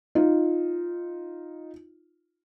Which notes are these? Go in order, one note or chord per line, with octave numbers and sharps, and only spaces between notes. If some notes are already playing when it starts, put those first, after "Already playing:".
D#4 F4